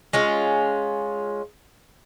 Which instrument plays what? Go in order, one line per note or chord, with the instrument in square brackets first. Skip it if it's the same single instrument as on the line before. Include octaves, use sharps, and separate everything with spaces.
[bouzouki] G#3 C#4 F4